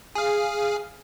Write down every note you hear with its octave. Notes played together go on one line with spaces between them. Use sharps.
G#4 F5